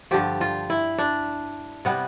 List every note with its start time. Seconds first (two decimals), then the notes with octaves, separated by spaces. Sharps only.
0.11 G2 D3 F3 G4
0.41 F4
0.70 E4
0.98 D4
1.85 C3 G3 B3